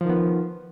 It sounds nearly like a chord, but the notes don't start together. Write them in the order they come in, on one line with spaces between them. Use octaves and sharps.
F3 D#3 B3